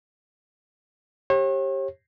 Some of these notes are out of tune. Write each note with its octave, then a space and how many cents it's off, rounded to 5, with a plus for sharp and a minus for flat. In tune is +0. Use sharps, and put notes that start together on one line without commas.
G4 +0 C#5 -40